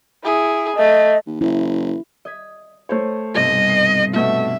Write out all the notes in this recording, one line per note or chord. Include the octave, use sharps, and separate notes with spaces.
E4 G#4
A3 D#5
D#2
F#1 E4
D#5 G#6 B6
A3 C5 C#5
B1 G2 C3 D#5
C7
B2 A3 E5